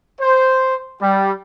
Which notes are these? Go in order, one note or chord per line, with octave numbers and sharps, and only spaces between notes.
C5
G3